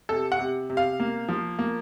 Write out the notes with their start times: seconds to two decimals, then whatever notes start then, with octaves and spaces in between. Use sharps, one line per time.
0.09 C3 A4
0.32 F#5
0.39 C3
0.70 C3
0.77 F5
1.00 A#3
1.29 F3
1.59 A#3